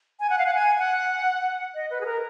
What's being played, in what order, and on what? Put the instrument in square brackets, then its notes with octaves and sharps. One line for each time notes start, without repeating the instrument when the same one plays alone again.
[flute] G#5
F#5
F5
F#5
G#5
F#5
D#5
B4
G#4
A#4